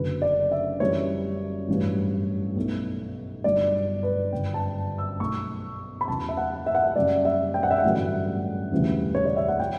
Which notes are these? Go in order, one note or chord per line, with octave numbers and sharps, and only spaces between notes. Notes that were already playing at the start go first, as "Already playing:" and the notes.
Already playing: F#1 F#2 D3 F#3 B4
D5
E5
F#2 E3 G3 C#5
A1 G2 F#3
B1 B2 A3
G1 G2 D3 F#3 D5
B4
G1 F#2 C#3 G5
A5
E6
B1 B2 A3 C#6
B5
E2 C#3 F#3 A5
E5
F#5
E5
F#5
E5
F#2 C#3 G3 D5
E5
G5
F#5
E5
F#5
A1 G2 D3 F#3 A3
E1 D2 C#3 E3 G3
C#5
D5
E5
F#5
E3 G5